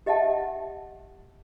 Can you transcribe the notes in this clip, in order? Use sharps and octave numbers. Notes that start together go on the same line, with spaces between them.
G4 D#5 E5 F#5 A5